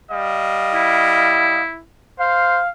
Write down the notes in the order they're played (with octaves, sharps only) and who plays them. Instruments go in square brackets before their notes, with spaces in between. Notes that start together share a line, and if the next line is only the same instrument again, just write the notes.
[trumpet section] G3 D#5 F5
[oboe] E4
[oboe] C5 [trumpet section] F5